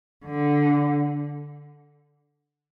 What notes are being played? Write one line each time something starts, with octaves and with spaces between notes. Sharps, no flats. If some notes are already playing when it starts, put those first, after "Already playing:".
D3